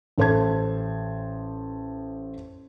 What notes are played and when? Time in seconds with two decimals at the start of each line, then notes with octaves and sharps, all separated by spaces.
0.18 A1 A4 C5 A5 G#6